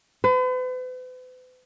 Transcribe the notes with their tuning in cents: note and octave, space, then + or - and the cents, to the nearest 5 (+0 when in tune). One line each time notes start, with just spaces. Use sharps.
B4 +45